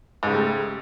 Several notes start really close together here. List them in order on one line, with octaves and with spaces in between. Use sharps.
G#2 C#3 G3 A3